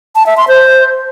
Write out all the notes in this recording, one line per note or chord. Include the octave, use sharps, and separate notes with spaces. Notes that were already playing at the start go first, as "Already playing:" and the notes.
A5
E5
C6
C5